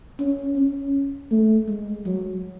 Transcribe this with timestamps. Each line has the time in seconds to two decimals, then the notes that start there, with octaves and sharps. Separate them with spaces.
0.19 C#4
0.56 C#4
1.31 A3
1.68 G#3
2.06 F#3